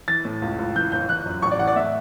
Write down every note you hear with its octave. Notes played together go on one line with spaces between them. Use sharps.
E3 A6
A2
C#2
C#2
E3 G6
G1 G6
E3 F#6
F#2
A1 C#6
D5
E3 F#5
D5
A2 E5